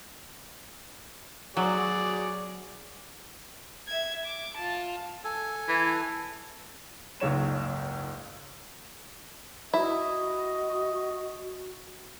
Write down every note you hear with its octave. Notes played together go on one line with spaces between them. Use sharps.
F#3 F#4 G#4 D5
E5 G#6
D6
F4 A5
A4 G#5
E3
F#1 C#2 G#2 C#5 E7
E4 F#4 D#5